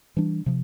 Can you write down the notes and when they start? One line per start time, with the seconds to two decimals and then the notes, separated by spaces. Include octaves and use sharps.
0.17 E3 G3 D4
0.46 C3 F3